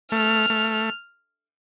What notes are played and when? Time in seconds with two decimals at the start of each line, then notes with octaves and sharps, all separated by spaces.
0.11 A3 F6
0.50 A3